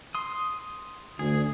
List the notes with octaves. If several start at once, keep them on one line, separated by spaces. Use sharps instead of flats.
C6 D#6
D2 G#4